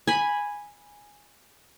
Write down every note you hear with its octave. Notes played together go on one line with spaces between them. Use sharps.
G#5 B5